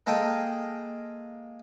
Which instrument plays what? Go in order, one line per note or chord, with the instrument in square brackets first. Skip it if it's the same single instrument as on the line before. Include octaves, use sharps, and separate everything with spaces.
[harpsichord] G#3 A#3 A4 A#4 D#5 G5